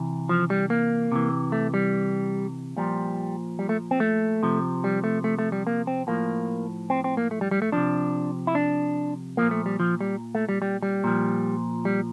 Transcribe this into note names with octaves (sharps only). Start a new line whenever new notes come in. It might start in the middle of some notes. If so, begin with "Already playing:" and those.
Already playing: C3 E3
F3
G3
A#3
C3 E3
A3
G3
A#2 F3 G3
G3
A3
C4
A3
C3 F3
G3
A3
A3
A3
G3
A#3
C4
A2 F3 A#3
C4
C4
A#3
A3
G3
G3
A3
C3 F3 D4
E4
D4
A#2 F3 A#3
A3
G3
F3
G3
A3
G3
G3
G3
A#2 F3
G3